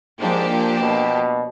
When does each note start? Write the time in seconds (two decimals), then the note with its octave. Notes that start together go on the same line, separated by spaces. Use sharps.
0.20 G#2 F3 A#3 D4 G4
0.50 A#2
0.80 B2